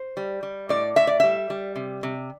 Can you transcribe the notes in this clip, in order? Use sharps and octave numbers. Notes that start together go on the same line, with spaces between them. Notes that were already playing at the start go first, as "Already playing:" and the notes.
Already playing: C5
G3
G3
A2 D5
A2 E5
D5
G3 E5
G3
C3
C3